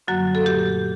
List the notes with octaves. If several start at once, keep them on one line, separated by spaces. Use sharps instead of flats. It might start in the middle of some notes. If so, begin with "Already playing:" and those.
F#2 D3 F#3 G3 A#3 F#4
A4
A#2 A3 G4